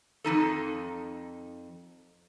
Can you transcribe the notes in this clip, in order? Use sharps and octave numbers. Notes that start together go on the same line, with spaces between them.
F2 G3 D#4 A4